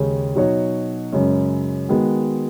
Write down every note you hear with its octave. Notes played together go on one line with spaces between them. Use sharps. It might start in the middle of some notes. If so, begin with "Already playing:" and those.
Already playing: D#2 C#3 G#3 C#4 G#4
B2 F#3 D#4 F#4 C#5
F#2 C#3 G#3 C#4
D#3 G#3 B3 F#4